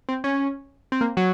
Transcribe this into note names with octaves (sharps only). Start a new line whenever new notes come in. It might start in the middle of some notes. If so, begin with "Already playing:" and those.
C4
C#4
C4
A#3
F#3